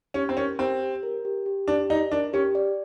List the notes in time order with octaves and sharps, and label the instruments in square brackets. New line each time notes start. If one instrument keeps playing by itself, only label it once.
[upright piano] C#4 [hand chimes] G4
[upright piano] C4
[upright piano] C#4 [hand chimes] A#4
[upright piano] C4 [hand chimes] G4
[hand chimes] G4
A#4
G4
G4
[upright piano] D4 [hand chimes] G4
[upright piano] D#4 [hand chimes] D5
[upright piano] D4 [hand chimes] A#4
[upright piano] C#4 [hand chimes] G4
[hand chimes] D5